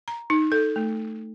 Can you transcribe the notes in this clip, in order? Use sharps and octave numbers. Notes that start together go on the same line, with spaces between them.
A#5
D#4
A4
A3